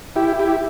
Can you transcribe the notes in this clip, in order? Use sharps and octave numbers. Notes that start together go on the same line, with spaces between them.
E4 G4
E4 G4